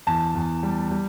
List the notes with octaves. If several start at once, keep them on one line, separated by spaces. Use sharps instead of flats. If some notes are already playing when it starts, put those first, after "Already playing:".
E2 A5
E2
G3
G3